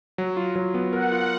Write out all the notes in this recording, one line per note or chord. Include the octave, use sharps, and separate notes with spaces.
F#3
F4
F#3
B3
A#4 F#5
F4